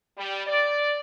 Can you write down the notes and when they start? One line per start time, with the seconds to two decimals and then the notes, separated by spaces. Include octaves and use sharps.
0.18 G3
0.47 D5